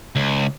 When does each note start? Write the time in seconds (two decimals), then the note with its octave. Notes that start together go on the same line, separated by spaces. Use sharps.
0.16 C#2